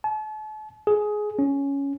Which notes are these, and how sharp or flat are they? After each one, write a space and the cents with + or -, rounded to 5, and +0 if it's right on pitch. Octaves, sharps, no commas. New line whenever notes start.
A5 -40
G#4 +15
C#4 +5